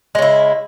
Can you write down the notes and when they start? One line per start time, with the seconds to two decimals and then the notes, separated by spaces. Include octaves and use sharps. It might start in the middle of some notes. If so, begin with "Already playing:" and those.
0.15 G#3
0.18 C#3
0.22 E4